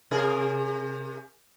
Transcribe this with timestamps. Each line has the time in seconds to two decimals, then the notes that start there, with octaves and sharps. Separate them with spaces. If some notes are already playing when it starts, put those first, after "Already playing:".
0.11 C3 G#4 A#4